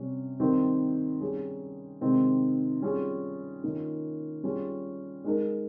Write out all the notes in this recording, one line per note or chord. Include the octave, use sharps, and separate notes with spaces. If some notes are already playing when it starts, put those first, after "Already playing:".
Already playing: C3 G3 C#4
D#3 G3 C4 G4 A#4
G3 C#4 G#4
C3 D#3 G#3 C4 D#4
G3 C#4 F4 G#4
D#3 A#3 C#4 F4
G3 C#4 F4 G#4
G#3 D#4 A#4